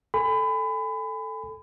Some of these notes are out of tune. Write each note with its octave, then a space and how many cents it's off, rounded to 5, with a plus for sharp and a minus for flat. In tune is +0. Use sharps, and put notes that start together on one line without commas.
A4 +0 G#5 -20 B5 +30